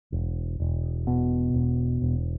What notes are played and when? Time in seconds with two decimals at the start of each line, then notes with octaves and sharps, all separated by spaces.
0.12 E1
0.60 E1
1.07 B2
1.54 E1
2.02 E1